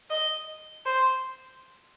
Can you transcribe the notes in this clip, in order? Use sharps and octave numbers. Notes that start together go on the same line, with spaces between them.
D#5
C5